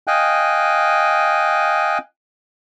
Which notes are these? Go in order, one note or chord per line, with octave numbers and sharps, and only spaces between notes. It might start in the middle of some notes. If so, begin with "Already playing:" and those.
D#5 F5 G5 G#5 F#6